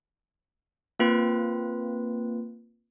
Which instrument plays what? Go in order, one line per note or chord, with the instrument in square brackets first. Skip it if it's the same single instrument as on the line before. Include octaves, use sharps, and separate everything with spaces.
[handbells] A#3 C4 F4 B4